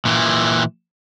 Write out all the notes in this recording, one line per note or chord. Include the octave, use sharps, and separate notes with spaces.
A#2 E3